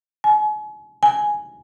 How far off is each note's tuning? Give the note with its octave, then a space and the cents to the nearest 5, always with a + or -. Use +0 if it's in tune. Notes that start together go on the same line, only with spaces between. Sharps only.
G#5 +40
G#5 +5